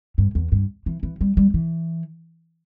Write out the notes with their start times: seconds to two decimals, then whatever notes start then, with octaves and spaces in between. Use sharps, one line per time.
0.18 G2
0.35 E2
0.52 G2
0.86 E3
1.03 E3
1.21 G3
1.37 G3
1.54 E3